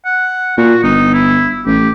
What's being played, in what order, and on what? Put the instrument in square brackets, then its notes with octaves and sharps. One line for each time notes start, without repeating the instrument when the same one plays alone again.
[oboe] F#5
[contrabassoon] A#2 [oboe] F#4
[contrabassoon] G1 [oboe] D#4
[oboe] E4
[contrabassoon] A1 [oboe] G4